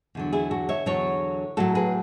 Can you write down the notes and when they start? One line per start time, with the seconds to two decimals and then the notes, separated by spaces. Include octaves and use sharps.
0.15 E2 D3 F#3
0.33 E4 G#4
0.51 F#4 A4
0.69 C#5 E5
0.86 E2 D3 F#3 A4 C#5
1.57 A2 F#3 F#4 A4
1.75 G#4 B4